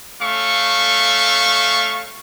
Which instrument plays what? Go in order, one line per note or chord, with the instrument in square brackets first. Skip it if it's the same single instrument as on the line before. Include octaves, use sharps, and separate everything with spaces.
[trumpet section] A3 C#4 F5 C#6